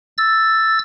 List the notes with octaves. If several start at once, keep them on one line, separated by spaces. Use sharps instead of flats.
E6 A6